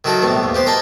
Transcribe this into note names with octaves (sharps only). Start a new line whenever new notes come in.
D#3 F#3 E4 F#4 A4 A#4
C2 A2 B3
D#2
B3 G4 C5
A#4 D#5 E5 G#5 A5